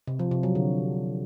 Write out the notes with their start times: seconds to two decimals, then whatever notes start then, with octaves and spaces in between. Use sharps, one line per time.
0.07 C3
0.19 F3
0.31 C3
0.43 F#3
0.55 D3